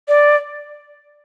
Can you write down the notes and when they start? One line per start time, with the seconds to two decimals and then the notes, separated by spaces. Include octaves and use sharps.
0.08 D5